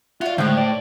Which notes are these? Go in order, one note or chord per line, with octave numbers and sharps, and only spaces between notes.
F4 F#4 D5 E5
A2 D3 G#3 C5 G5 F#6
D5